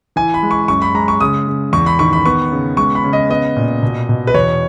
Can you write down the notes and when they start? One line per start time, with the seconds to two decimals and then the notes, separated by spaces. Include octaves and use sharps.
0.16 E3 G#5
0.34 B5
0.43 G#3
0.51 C#6
0.68 F#2 C#6
0.82 B5
0.95 G#3 A#5
1.08 C#6
1.20 C#3 D#6
1.47 C#3
1.73 E2 C#6
1.86 B5
1.99 D#3 C#6
2.13 B5
2.25 B3 C#6
2.52 C#3
2.77 G#3 C#6
2.95 B5
3.04 C#3
3.13 D#5
3.30 B3 D#5
3.56 A#2
3.83 B2
4.09 B2
4.27 B4
4.34 E2 C#5